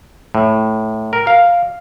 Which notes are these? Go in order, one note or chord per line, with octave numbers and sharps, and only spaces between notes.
A2
A#4
F5